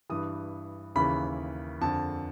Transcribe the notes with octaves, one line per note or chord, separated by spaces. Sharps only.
G2 E3 D#6
D#2 C#3 E3 B5
F2 D3 A5